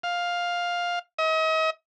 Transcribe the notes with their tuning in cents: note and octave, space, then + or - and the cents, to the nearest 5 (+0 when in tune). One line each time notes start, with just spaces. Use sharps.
F5 +10
D#5 +40